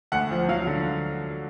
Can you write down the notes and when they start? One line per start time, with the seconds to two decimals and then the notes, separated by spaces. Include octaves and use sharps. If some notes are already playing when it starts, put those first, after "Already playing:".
0.12 D2 F#5
0.31 F3
0.49 F#3 F5
0.67 D3